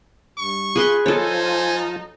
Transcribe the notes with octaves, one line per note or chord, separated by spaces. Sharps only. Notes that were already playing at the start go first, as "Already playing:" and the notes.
G2 C#6
F4 G#4 B4 C6
F3 D#4 F4 A4 C5 C#5 G#5 A5